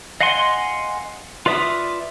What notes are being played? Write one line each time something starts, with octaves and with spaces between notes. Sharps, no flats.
D#5 F5 F#5 G#5 C6
F4 B4 D5 E5 D#6